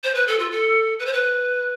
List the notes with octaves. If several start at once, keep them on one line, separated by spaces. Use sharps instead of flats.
C5
B4
A4
F4
A4
B4
C5
B4